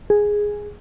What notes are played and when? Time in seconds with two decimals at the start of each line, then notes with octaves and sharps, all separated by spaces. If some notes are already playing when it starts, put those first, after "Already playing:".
0.10 G#4